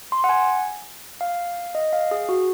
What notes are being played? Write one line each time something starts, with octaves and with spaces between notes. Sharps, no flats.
C6
F#5
G#5
F5
D#5
F5
G#4
F#4